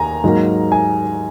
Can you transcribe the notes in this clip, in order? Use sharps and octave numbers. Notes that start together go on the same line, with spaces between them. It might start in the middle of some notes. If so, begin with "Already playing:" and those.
Already playing: D#2 G#5 A#5
G#2 F#3 A#3
G#5